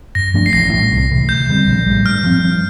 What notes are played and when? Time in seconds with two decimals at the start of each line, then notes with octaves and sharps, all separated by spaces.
0.15 G2 A#6
0.34 F3 A3 D4
0.46 C7
0.53 A1 A#6
0.73 A2 G3
0.91 C2
1.10 C3 E3 A3
1.29 D2 G6
1.49 D3 G3 C4
1.67 A#1
1.87 A2 G3
2.05 G2 F6
2.24 F3 C4
2.43 G2